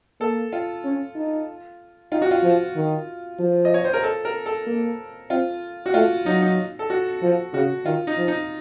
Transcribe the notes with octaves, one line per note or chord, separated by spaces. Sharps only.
A#3 A4
F4
C#4
D#4
D#4 F4
F#4
F4
F3
D#3
F3
D#5
C#5
C5
A#4
A4
A#4
A4
A#3
C4 F4
F#4
A3 F4
F#3 D#4
D#4
A4
F#4
F3
C#3 F#4
D#3 F4
D#4
F3
D#4